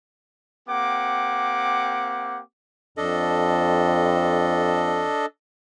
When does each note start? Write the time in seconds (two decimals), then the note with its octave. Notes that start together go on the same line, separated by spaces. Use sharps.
0.69 A#3 C4 G4 F#5 D6
2.97 F2 D4 A4 D#5